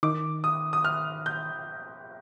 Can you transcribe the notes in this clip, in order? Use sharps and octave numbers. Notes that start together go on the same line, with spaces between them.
D#3 D6
D#6
D#6
F6
G6